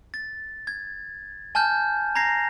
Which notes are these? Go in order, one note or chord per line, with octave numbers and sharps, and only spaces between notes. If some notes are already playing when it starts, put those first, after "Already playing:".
A6
G#6
G#5 A5 F6 G6
A#5 G#6 A#6 C7